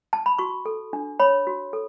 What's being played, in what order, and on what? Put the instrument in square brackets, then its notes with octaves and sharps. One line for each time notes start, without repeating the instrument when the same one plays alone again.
[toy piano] A5
B5
F#4 C#6
A4
D4
C#5 B5
F#4
A4